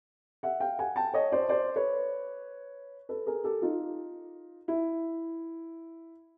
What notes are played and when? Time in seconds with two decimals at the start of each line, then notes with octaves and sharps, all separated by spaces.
0.43 E5 F#5
0.60 F5 G5
0.79 F#5 G#5
0.96 G5 A5
1.14 C#5 D#5
1.32 C5 D5
1.49 C5 D5
1.76 B4 C#5
3.09 A4 B4
3.26 G#4 A#4
3.44 G4 A4
3.62 D#4 F4
4.68 E4